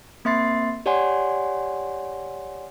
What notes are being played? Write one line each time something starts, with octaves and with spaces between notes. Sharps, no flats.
A#3 C4 E5 C6 A6 C7
G4 C#5 D5 F#5 G#5 C6